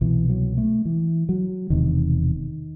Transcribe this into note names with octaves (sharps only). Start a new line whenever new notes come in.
C2 B2 E3
F#3
A3
E3
F#3
E1 E2 C3 D#3